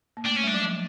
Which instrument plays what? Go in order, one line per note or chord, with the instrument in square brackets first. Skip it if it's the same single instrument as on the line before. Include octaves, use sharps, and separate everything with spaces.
[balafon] A#3
[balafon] A3 [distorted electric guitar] D4
[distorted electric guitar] C#4
[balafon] G3 [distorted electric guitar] D4
[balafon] F#3
F3